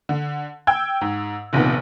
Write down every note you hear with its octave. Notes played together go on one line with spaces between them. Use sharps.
D3
G5 E6 G#6
G#2
F1 A#1 C3 D#3 B3